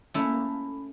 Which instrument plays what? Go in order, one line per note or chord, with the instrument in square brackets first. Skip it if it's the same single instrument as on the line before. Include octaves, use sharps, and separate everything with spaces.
[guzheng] A3 C#4 E4 A4 [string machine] A#3